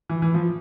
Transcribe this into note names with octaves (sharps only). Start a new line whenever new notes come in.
E3
E3
F3